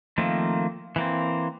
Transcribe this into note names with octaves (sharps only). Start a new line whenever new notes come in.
D#3 F3 A3 A#3 C4
E3 A#3 C4